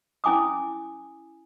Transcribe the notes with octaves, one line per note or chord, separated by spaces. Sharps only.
C#4 E4 G#5 D6 D#6